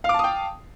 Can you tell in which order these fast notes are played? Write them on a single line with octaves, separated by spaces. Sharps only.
F5 D6 A5 D#6 G5